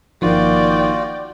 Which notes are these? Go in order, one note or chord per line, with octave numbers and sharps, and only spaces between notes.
G1 D#3 F3 A#3 F4 F#4 D5 G5